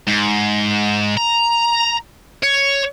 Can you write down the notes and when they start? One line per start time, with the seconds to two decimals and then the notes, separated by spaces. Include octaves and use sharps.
0.07 G#2
1.18 A#5
2.43 C#5